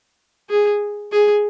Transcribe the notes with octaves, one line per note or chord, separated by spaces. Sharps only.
G#4
G#4